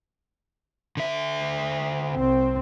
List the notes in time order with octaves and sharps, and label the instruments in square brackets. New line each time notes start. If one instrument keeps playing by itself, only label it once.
[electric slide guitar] D3 E5
[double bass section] C2 C4